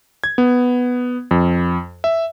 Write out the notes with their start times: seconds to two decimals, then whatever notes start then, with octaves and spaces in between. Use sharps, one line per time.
0.24 G#6
0.38 B3
1.31 F2
2.04 E5